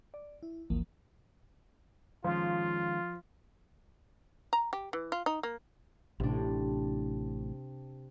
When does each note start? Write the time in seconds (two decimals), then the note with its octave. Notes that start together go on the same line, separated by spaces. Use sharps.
0.14 D5
0.43 E4
0.70 G#1 D2 E3 F3 A#3
2.24 D#3 F3 G#3 C#4 F4
4.53 A#5
4.73 G4
4.93 E3
5.12 F4
5.26 D#4
5.43 A#3
6.20 A1 A2 C3 D4